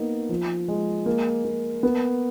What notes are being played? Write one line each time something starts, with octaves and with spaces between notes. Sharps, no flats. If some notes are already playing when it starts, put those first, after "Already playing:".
Already playing: A#3 B3 D#4
F3
G#3
A#3
A#3
B3